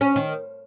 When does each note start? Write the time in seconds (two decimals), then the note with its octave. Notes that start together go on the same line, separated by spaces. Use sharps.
0.01 C#4
0.16 D#3